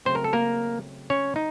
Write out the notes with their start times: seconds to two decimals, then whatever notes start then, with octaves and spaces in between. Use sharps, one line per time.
0.05 C#3 F#3 A3 C4 C5
0.15 A#4
0.24 A4
0.33 A#3 A#4
1.10 C#4 C#5
1.36 D#4